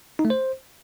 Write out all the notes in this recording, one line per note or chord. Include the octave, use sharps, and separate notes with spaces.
D#4
A3
C5